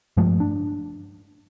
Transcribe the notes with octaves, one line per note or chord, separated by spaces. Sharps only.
G2 F3 G#3 A3
D4